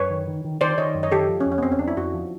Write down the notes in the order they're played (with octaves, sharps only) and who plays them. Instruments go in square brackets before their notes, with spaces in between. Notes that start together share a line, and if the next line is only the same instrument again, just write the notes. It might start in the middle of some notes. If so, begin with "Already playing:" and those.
Already playing: [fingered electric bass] F#2 [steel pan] B4 C#5
[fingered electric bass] D#3
D#3
D#3
[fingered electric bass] D#3 [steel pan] C5 D5
[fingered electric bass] D#3 [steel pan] C#5 D#5
[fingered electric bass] F#2
[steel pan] C#5 D#5
[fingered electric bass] D#3 [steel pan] G4 A4
[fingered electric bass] F3
[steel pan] C#4
[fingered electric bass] F2
[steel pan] C#4
B3
[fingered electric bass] F2 [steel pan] C4
[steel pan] C#4
[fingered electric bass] F2 [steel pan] D4
[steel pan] E4
[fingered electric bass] F2 [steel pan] F#4
[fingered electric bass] F3